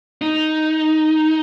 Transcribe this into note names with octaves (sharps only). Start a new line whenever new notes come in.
D#4